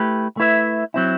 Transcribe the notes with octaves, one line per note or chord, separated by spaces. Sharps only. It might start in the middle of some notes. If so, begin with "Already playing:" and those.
Already playing: A3 E4 G4 B4
A3 E4 B4 E5
F#3 C4 E4